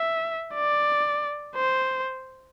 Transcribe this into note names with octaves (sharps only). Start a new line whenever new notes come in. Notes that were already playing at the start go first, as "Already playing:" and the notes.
Already playing: E5
D5
C5